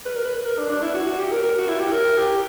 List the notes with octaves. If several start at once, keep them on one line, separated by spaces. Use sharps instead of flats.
B4
A#4
B4
A#4
D4
D4
E4
F#4
F#4
G4
A#4
A#4
F#4
E4
G4
A#4
G4